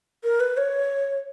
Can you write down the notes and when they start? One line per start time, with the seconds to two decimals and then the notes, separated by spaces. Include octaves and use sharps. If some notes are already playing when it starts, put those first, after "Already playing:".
0.24 A#4
0.40 B4
0.57 C#5